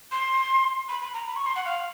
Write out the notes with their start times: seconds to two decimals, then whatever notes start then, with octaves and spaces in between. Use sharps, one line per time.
0.12 C6
0.89 B5
1.01 B5
1.14 A#5
1.27 B5
1.36 C#6
1.46 C6
1.56 F#5
1.65 F5